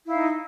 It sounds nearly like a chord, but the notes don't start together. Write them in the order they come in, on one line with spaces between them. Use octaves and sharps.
E4 F5 D#4